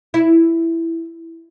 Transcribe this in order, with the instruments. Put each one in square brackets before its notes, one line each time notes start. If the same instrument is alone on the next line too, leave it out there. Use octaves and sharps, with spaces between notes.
[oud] E4